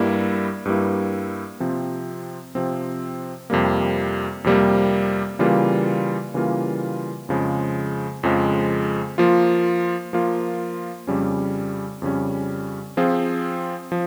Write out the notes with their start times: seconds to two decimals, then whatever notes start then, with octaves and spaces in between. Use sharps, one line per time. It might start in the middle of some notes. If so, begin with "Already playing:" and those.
Already playing: G2 G3 A#3 E4
0.65 G2 G3 A#3 E4
1.60 C3 F3 C4
2.55 C3 F3 C4
3.50 F2 C3 G3 A#3
4.44 F2 C3 G3 A#3
5.39 C#3 E3 G3 A#3 F4
6.34 C#3 E3 G3 A#3 F4
7.29 F2 C#3 F3 G#3
8.23 F2 C#3 F3 G#3
9.18 F3 A#3 F4
10.13 F3 A#3 F4
11.07 F2 C#3 G3 C#4
12.02 F2 C#3 G3 C#4
12.97 F3 C4 F4 G#4
13.92 F3